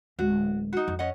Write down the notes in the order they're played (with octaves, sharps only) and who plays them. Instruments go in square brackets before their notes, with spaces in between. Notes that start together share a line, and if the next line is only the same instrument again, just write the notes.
[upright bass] D1 G#3 [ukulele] F#4
[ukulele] D#4 F#4
[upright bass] F2
[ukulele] C#4 D#5 F#5